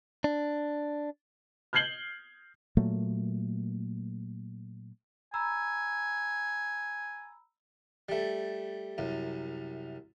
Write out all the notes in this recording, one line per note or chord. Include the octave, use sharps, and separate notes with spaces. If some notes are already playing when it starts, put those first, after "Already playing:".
D4
F6 G6 G#6 C7 F#7 G7
A#2 F#3 A3 A#3
G#5 A#5 B5 E6
G3 A3
C2 F#2